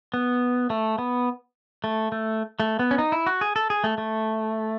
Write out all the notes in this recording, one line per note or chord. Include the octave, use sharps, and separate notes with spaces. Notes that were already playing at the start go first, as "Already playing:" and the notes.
B3
A3
B3
A3
A3
A3
B3
C#4
D#4
E4
F#4
G#4
A4
G#4
A3
A3